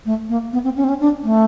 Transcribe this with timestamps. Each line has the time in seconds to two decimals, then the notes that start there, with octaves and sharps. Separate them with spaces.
0.05 A3
0.29 A#3
0.53 B3
0.64 C4
0.76 C#4
0.84 C4
0.89 C#4
1.00 D4
1.24 A3